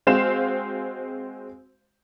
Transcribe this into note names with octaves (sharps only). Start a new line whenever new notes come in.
G#3 C4 F#4 C5 F5 E7